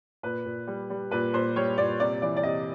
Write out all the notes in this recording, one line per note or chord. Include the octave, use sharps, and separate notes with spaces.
A#2 B4
A#2
G3
G3
A#2 B4
A#2 C5
G3 C#5
A#2 D5
C3 D5
E3 D5
D5
C3 D#5